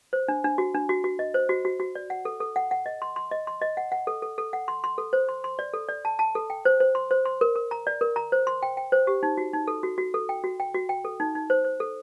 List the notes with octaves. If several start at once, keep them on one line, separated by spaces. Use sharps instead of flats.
C5
D4
D4
F#4
D4
F#4
F#4
D#5
C5
F#4
F#4
F#4
D5
F#5
A4
A4
F#5
F#5
D#5
C6
C6
D#5
C6
D#5
F#5
F#5
A4
A4
A4
F#5
C6
C6
A4
C5
C6
C6
D5
A4
D5
A5
A5
A4
G5
C5
C5
C6
C5
C6
A#4
A#4
A#5
D5
A#4
A#5
C5
C6
G5
G5
C5
G4
D#4
F#4
D#4
A4
F#4
F#4
A4
G5
F#4
G5
F#4
G5
A4
D#4
D#4
C5
C5
A4